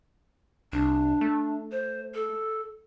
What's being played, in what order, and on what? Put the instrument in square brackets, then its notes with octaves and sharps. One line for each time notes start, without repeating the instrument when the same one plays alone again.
[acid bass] C2 [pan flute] D4
[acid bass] A3
[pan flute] C5
A4